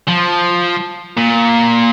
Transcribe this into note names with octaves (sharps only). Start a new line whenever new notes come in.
F3
A#2